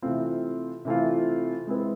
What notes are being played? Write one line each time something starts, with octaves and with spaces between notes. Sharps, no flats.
C3 E3 A3 C4 F4
C3 E3 A3 C4 F4
G#3 C4 E4 B4